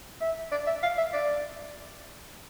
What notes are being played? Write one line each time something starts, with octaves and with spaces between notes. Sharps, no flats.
E5
D5
E5
F5
E5
D5